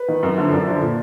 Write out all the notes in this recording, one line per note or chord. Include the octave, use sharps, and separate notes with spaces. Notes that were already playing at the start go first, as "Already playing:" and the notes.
Already playing: B4
D#3
F#2
D3 F3
F#2 D5
D3 F3
A#2